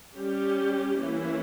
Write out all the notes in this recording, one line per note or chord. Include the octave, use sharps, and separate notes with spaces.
G3 C#4 G4
E3 A#3 C#4 E4